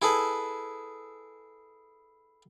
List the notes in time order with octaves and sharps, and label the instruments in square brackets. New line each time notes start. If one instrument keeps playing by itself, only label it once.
[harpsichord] E4 G#4 A4 B4